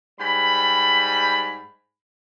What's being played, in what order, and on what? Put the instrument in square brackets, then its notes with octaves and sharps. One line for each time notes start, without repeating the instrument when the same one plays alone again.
[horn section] G#2 G3 B5